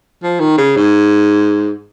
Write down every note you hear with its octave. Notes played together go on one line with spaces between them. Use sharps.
F3
D#3
C#3
G#2